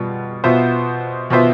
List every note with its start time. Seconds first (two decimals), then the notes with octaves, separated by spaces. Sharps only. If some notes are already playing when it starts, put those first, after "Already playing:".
Already playing: B2 G3 B3 F4
0.44 B2 B3 F4 C5 E5
1.30 B2 B3 F4 C5 E5